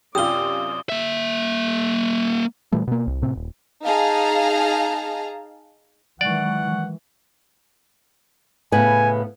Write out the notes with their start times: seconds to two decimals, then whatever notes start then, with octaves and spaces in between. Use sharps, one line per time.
0.15 F#2 C3 F4 G4 D5 D#6 G7
0.89 A#3 E5
2.72 A#2 E3 G3 A3
2.87 B2 A#3
3.07 C2
3.22 A2 C3 C4
3.36 D#1
3.85 D#4 G#4 F5 A5 A#5
6.21 D#3 E3 F#3 G#3 D5 F#5 C#6
8.72 A2 C#3 B3 G#5